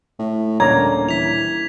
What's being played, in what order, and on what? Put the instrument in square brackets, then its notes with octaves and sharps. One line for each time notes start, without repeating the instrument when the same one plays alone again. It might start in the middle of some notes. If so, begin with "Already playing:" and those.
[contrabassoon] A2
[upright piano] D#1 A#3 C#4 [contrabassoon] D3 [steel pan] A#5 [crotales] G#6
[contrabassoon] E3 [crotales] B6 F7